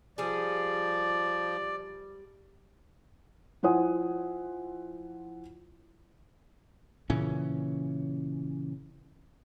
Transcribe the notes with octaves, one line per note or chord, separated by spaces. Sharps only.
F3 G3 G#4 D5
F3 E4 C5 F#5 G#5 D#6
A#2 C#3 E3 C#4